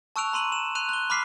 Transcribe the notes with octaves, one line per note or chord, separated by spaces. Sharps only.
A5 C#6 E6 F#6 D7 F7
A#5 C6 D#7 F#7
E7 F#7
C6 F#6 D#7 F7
F#6 G7
B5 D6 F6 B6 C7